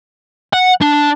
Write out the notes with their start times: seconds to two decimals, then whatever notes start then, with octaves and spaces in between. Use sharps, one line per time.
0.53 F#5
0.81 D4